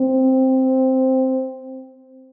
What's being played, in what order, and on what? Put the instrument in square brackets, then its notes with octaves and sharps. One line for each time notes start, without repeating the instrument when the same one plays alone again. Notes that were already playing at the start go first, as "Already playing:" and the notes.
Already playing: [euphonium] C4